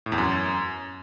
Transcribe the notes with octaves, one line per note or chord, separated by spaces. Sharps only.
A2
E2
F#2